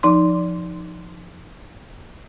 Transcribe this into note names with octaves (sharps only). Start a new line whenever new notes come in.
F3 D#4 C6